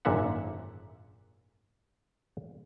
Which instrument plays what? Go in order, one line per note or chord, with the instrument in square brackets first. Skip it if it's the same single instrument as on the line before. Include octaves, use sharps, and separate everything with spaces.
[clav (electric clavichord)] G#1 F#2 A#2 D3 E5 F#5